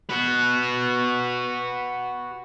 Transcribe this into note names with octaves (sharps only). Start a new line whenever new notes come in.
F#4 B4